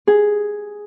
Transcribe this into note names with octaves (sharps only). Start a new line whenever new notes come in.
G#4